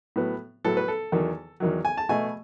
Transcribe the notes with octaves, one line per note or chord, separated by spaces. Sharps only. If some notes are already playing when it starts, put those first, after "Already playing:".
A2 F#3 B3
A2 F#3 B3 A4
B4
A4
E2 D#3 F#3
E2 D#3 F#3
G#5
A5
B2 A3 G#5